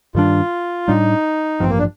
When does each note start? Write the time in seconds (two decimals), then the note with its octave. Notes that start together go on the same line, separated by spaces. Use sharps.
0.15 G2 D#3 G3 D4 F4
0.88 A2 G3 D4 D#4
1.60 A1 G2 F3 C4
1.69 A#3
1.79 D4